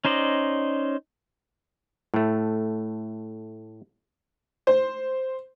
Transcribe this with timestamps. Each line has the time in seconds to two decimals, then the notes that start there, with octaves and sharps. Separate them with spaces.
0.05 C#4 D#4 C5 D5 D#5
2.14 A2 A3
4.67 C5